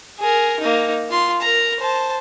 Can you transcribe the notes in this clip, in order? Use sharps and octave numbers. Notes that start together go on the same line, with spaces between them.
G#4 A#4
A#3 D#4
F4 C6
A#4 A#5
C5 A5